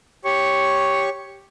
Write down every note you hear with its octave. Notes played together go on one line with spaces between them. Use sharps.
G4 C#5 C#6